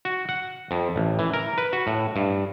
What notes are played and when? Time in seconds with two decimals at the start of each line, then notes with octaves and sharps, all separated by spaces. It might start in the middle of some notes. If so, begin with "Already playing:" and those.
0.05 F#4
0.29 F#5
0.71 F2
0.96 A1
1.19 E3
1.33 A#4
1.58 B4
1.73 F#4
1.87 A2
2.16 G2